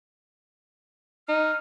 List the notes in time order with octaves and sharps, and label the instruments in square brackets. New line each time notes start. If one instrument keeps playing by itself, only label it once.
[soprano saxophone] D#4 [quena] F6